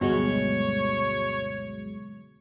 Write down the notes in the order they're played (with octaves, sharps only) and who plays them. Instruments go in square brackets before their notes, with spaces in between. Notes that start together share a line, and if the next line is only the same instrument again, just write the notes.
[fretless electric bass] D2 G2 [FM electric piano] B2 F#3 G#3 [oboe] C#5